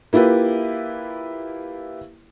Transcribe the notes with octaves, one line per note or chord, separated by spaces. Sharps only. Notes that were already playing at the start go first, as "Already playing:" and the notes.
A#3 E4 F4 G4 B4